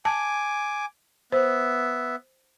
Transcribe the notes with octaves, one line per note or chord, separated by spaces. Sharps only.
G#5 A5 D6
B3 C5 E5